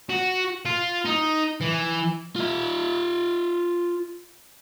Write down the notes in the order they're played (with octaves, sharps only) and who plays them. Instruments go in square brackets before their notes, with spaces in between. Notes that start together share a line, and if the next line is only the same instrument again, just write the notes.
[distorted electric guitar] F#4
F4
D#4
E3
[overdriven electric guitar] F4 E5